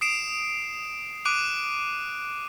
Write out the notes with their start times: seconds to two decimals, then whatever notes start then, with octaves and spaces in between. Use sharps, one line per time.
0.01 D#6 C7 D7 E7
1.25 D6 F#6 D7 D#7 F7